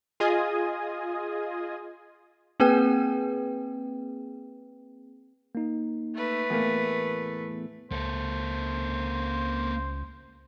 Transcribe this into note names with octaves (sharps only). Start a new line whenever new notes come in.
F4 G#4 D#5 G#5 D#6
A#3 C4 G#4 B4 G5
A#3 D#4
A3 B4
E2 A2 A#3 B3 A#4
C#2 A#3 A4 C5